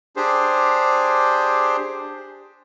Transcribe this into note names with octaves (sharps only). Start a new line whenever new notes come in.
D4 G4 G#4 C5